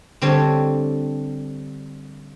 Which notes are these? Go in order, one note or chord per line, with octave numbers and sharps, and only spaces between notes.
D3 G3 C4 A4 C#5